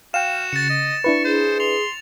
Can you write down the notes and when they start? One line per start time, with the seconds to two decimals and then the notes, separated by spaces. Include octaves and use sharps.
0.14 F#4 F5 G5 E7
0.53 C#3 A6 C#7
0.70 D#5
1.04 D4 E4 B4 C#6
1.25 G#4 C5
1.60 C6 F7